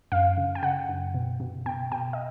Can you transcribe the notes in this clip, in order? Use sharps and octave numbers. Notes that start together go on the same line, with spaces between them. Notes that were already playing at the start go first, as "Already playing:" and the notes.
F#2 F5
C#3
G5
C#3 F#5
F#2
B2
B2
B2 G5
B2 G5
D#5